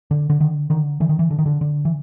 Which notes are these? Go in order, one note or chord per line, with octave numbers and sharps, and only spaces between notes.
D3
D3
D3 D#3
D3 D#3
D3 E3
D#3
E3
D3
D#3
D3
D3
E3